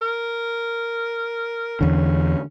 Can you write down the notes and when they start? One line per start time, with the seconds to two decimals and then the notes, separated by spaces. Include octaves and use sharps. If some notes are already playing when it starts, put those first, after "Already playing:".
0.02 A#4
1.81 E2 D3 C#4